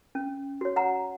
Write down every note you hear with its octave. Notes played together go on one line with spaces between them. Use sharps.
C#4
F#4 C#5
F#5 A#5